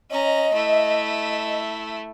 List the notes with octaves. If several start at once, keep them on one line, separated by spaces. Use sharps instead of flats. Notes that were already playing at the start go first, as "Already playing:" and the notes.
C#4 D#5 A#5
A3 E4